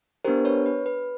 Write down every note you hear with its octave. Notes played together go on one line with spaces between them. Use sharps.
B3 D4 G4 A#4 C5
B4 C#5
B4
B4